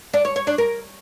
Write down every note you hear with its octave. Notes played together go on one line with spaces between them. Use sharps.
D4
C#5
C#5
D4
A#4